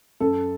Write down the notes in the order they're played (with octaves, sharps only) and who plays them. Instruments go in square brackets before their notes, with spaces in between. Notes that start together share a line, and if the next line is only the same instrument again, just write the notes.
[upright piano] F#2 A4